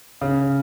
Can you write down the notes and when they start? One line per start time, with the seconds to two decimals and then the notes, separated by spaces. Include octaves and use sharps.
0.21 C#3